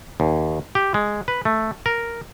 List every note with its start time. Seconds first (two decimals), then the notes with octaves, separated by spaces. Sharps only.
0.20 D#2
0.75 G4
0.94 G#3
1.28 B4
1.45 A3
1.86 A#4